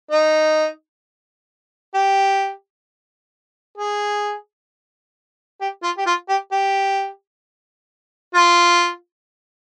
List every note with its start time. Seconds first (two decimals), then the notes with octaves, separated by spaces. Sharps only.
0.11 D#4
1.94 G4
3.78 G#4
5.61 G4
5.83 F4
5.98 G4
6.06 F4
6.29 G4
6.52 G4
8.35 F4